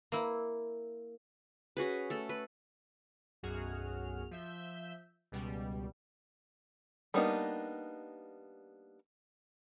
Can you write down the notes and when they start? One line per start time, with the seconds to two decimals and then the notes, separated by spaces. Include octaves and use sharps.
0.12 A#3 E4
1.77 C#4 F#4 G#4 B4
2.10 A3 A4
2.29 B4
3.43 B1 F#2 F#4 G#4 F6
4.31 F3 E5 G6
5.32 C#2 B2 G3
7.14 G3 A#3 B3 D4 D#4